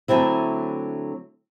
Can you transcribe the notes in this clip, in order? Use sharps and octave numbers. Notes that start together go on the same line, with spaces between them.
D3 F#3 A3 C4 E4